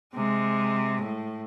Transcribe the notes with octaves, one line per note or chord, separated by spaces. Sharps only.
C3 G#3
A2